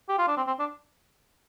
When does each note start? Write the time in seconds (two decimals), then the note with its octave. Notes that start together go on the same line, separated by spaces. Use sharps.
0.09 G4
0.18 F4
0.28 D4
0.37 C4
0.47 C4
0.60 D4